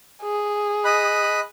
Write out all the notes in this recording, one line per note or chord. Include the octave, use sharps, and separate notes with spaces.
G#4
D#5 B5 F#6